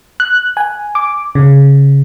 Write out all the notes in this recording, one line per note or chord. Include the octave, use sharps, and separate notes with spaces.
F#6
G#5
D6
C#3